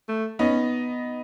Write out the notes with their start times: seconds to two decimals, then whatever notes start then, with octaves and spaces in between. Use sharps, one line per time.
0.09 A3
0.39 B3 C#4 D#4